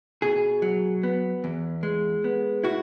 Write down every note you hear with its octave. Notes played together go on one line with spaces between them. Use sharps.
B2 G#4
F#3
B3
E2
G#3
B3
E4 F#4